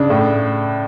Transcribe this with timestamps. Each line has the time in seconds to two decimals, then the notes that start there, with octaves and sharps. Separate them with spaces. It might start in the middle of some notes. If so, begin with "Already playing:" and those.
Already playing: C#3 D4
0.10 A2